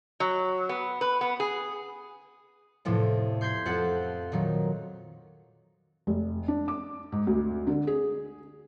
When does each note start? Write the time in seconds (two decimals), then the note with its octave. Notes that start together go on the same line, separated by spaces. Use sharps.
0.20 F#3
0.69 B3
1.01 B4
1.21 B3
1.40 G#4
2.85 E2 A2 C3 F3 A3
3.41 C6 G6 G#6 B6 C7
3.65 F2 A4 F#5 F#6
4.32 A#2 D#3 F#3
6.07 F1
6.48 D4
6.68 D6
7.12 G#2
7.27 D2
7.67 D3
7.87 G#4